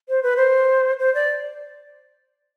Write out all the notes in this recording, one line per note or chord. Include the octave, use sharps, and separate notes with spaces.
C5
B4
C5
C5
D5